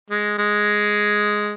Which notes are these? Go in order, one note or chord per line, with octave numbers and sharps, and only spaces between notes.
G#3
G#3